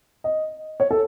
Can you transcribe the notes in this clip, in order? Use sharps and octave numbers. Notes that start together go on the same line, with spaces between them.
D#5
C#5
A4